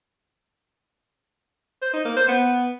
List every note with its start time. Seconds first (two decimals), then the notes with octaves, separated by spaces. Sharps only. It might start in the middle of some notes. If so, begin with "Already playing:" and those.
1.82 C5
1.93 D#4
2.05 A#3
2.16 C5
2.28 B3